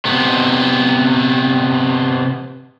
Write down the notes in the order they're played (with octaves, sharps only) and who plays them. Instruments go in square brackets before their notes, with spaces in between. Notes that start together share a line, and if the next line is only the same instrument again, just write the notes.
[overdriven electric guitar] C3 B3